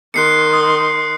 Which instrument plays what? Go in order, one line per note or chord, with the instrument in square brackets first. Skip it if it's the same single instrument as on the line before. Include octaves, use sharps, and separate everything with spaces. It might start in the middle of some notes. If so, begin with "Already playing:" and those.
[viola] D#3 C6 [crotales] F#6 C7 C#7
[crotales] D#6